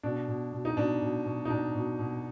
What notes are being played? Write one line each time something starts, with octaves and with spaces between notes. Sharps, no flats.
B2 D4
B2
B2
D#4
B2 D4
B2
B2
D#4
B2 D4
B2
B2